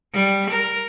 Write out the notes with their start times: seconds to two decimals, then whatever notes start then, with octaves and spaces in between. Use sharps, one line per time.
0.13 G3
0.50 A#4